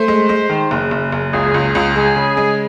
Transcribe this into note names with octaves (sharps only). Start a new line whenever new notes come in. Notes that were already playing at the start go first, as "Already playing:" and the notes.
Already playing: A3 C5
G#3
G#3
D#3
F#1 G#4
F#1
F#1
C#2 G#4
C#2
C#2
G#3 G#4
C#3
G#3